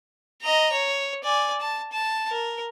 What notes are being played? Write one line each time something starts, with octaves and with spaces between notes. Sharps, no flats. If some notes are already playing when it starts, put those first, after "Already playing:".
D#5 A#5
C#5
D5 G#5
A5
A5
A#4